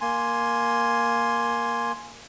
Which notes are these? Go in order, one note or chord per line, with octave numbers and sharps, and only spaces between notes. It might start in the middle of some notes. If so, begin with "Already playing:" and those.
A#3 G#5 C6